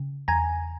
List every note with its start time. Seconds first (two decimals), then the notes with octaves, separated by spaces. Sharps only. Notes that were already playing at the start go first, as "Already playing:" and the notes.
Already playing: C#3
0.28 E2 G#5 A#5